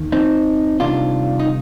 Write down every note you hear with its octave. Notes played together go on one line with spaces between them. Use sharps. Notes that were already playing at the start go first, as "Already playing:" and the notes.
Already playing: D#2 D#3
C4 D#4
C2 C3 D#3 D4 F4
D#4